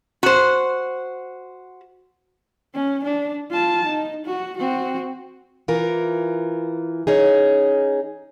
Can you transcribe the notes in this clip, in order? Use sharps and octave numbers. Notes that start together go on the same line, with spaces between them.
F#4 C5
C#4
D4
F4 A5
D#4
F#4
C4 F#4
E3 F4 A#4
C#4 D#4 G#4